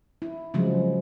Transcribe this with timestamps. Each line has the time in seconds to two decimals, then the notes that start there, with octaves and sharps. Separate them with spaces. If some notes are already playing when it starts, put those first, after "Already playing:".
0.22 E4
0.54 C#3 F3 F#3 G#3